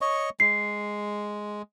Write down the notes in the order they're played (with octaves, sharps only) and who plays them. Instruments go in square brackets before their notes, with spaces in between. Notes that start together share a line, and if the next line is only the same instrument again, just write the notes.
[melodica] C#5 D#5 C#6
[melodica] G#3 [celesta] C7